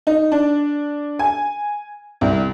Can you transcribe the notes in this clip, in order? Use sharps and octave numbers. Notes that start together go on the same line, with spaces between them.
D#4
D4
G#5
C2